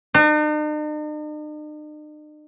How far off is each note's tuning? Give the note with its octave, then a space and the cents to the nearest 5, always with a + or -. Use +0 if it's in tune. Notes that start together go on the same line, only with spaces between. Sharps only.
D#4 -45